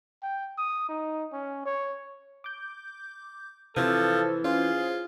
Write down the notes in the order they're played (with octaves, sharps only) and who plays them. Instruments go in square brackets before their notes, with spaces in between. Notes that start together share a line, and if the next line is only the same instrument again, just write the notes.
[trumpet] G5
D#6
D#4
C#4
C#5
[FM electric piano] D6 G6
[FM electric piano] C3 C5 [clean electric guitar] E3 [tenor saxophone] F3 [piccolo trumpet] A4
[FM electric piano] C#4 C5 [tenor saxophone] F4 [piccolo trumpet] G#4